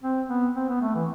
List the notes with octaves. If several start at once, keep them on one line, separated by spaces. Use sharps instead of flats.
C4
B3
C4
B3
A3
E3